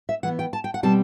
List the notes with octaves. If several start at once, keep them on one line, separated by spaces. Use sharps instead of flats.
E5
E3 B3 F#5
G5
A5
G5
F#5
B2 G3 C4 A5